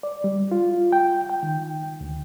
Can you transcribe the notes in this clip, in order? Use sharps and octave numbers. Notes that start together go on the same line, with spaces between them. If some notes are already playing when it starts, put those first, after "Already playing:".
D5
G3
F4
G5
G5
D#3
D2